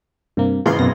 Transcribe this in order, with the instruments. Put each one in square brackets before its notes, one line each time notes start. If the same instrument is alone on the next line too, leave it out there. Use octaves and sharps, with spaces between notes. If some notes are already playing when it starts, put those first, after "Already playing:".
[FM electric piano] G2 C3 A#3
[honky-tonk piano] G#1 C#3 E3 [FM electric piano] F4 A#4 C6
[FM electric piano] F#2 B2 A#6